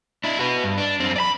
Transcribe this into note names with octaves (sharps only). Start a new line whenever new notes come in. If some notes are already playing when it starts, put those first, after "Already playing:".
D4 E4
F#4 B4
G2
D4
F#2 C4
D5 B5